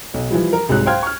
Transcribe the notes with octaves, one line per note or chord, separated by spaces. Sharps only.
B1
E3 F3 G3
A#4
C2 G#2 F#3 F#6
C5 F5 G5 C6 F6 G#6
C#6 F6